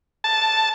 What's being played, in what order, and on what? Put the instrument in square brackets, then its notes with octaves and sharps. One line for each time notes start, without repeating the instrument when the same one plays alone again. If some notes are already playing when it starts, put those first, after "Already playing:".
[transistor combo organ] A5